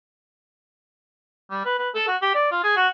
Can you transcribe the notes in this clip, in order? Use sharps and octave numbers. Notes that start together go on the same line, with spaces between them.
G3
B4
B4
A4
F#4
G4
D5
F4
G#4
F#4